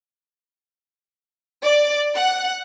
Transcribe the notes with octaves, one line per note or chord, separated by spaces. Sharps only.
D5
F#5